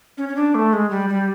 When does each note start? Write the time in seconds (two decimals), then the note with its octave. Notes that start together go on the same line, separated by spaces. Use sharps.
0.18 C#4
0.28 C#4
0.36 D4
0.55 A3
0.73 G#3
0.90 G3
1.09 G3